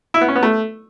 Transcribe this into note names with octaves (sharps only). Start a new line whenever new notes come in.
E4
B3
C#4
B3
A3